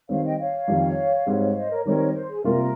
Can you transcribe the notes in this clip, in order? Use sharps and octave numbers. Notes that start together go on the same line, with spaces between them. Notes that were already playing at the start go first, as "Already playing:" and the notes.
D#3 G3 C4 C#5 F5
D#5 G5
C#5 F5
F2 D#3 G3
G#2 G3 C4
C5 D#5
A#4 C#5
D#3 G3 C4 D#4 A#4 C#5
C5
G#4
C3 G3 A#3 F4 A#4